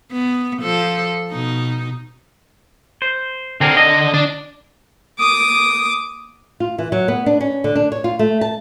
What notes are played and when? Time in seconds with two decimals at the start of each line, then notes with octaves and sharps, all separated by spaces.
0.12 B3
0.62 F3 A4
1.31 B2 D#4
3.02 C5
3.61 D3 C4 G#4 A#4
3.77 D#5
4.14 D4 D5
5.19 D6 D#6
6.60 F4
6.78 E3
6.92 F#3
7.08 B3
7.26 D4
7.40 C#4
7.64 D3
7.75 D4
7.92 C#5
8.04 F4
8.19 A3
8.41 A5